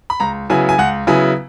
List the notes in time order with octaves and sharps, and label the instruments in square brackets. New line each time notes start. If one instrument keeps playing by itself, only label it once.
[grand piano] B5
C#2 A#5
C#3 F#3 B3 E4 G#5
G#5
C#2 F#5
C#3 F#3 B3 E4 G#5